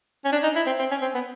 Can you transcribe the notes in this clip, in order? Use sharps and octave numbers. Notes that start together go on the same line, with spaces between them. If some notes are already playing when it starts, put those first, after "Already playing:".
C#4
D4
D#4
E4
C4
C4
C#4
C4
B3